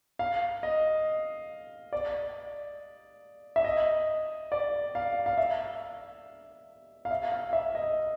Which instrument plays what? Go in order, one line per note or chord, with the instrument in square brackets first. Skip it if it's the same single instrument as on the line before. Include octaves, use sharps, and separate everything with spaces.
[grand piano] F5
D#5
D5
E5
D#5
D5
F5
F5
E5
F5
E5
F5
E5
D#5